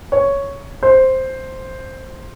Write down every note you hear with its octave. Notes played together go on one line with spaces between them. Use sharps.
C#5
C5